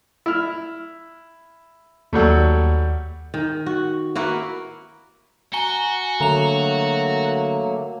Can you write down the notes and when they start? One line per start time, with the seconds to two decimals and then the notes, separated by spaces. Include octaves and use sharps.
0.26 E4 F6
2.13 D#2 F#3 G3 A3
3.34 D#3
3.66 F#4
4.15 A#3 E4 F#4 B4
5.53 F#4 G#5 A#5 G7
6.21 D3 F#3 A3 A#3 A#5 F7